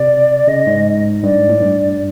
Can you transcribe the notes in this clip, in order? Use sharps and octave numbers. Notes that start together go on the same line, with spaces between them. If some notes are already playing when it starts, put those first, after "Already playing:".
Already playing: C3 D5
C#3 D#5
G#2
G2 D5
G#2
A2
G2